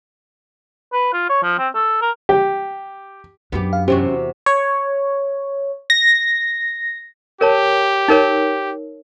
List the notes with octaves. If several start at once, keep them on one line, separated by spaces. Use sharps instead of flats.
B4
F4
C#5
F3
C4
A4
A#4
G4
F#2 B3 D4 G4
F5
E2 C3 C#4 F#4 G4 C5
C#5
A#6
G4 A#4 C#5 A5
D#4 A#4 C#5